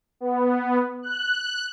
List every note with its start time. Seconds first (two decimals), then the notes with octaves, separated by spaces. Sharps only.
0.20 B3
1.03 F#6